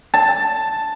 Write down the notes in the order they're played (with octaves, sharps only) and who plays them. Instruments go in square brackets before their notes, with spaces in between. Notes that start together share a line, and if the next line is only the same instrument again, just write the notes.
[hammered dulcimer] A5